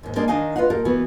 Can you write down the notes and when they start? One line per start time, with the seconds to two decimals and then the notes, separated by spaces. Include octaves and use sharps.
0.03 D#2 G#2
0.16 G3 G#3 A#3 D4
0.28 D#3 D4 D#4 D#5 F5 G#5
0.56 F4 B4 D#5 F5 F#5
0.70 A#2 G4 A4 A#4
0.85 E3 B3 F#4